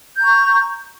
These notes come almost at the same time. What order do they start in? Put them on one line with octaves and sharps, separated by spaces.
G6 A#5 C#6